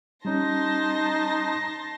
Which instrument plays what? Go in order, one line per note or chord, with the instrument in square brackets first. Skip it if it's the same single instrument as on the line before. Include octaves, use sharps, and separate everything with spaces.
[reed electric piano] G3 C#4 [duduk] D#4 [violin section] A5 C6 A#6